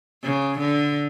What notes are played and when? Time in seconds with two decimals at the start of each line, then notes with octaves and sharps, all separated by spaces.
0.23 C#3
0.59 D3